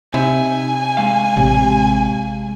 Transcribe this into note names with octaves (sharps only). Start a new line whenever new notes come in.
C3 D#4 E5 G#5
G#3 F5
A1 C3